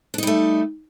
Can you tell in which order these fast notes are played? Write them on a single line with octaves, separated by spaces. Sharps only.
D4 D#4 G3 A3